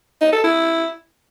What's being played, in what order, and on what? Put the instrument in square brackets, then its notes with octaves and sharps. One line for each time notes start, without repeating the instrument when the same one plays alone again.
[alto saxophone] D#4
A4
E4